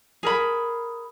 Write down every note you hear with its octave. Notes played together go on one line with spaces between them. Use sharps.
G#4 A#4 B5